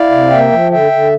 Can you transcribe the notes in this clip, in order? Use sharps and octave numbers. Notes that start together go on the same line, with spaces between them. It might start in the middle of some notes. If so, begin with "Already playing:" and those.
Already playing: E4 D5 F5
C3
A#3 E5 G5
F3
D3 E5 G5
D3